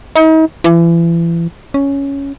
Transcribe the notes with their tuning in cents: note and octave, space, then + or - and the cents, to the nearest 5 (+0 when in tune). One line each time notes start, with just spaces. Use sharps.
D#4 +40
E3 +35
C#4 +5